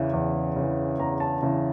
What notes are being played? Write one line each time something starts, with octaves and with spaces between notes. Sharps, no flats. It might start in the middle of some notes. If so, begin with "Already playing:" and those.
Already playing: E2 C#3 E3
E2
C#3
E3
E2 A#5
A5
C#3 E3